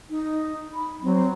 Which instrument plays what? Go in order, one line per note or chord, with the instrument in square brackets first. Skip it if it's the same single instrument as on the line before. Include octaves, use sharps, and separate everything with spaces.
[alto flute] D#4
B5
[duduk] F#3 [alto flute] C4